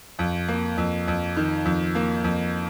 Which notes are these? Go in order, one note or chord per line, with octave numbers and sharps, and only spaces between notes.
F2
A#3
F2
F2
D#3
F2
A#3
F2